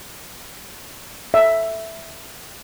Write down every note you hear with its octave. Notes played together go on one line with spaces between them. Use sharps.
E5